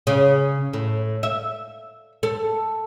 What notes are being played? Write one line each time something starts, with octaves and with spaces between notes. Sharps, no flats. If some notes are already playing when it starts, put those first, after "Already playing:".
C#3
A2
E5
A4